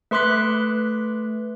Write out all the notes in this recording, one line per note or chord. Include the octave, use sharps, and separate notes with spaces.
A3 B4 C6 D6 F#6 B6